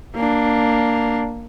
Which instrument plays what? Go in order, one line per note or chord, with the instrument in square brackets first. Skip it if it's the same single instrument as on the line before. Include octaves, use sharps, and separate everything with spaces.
[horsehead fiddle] A#3 D4